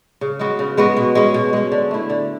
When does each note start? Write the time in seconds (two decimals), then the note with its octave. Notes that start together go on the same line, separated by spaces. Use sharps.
0.21 C#3
0.39 G#3 B3 F#4
0.59 C#3
0.77 G#3 B3 F#4
0.97 B2
1.15 G#3 C#4
1.34 B2
1.53 G#3 C#4
1.72 D3
1.91 A3 E4
2.10 D3